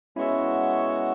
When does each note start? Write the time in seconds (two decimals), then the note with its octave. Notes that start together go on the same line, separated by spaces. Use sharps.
0.16 G#3 B3 C#4 E4 F#4 C#5 E5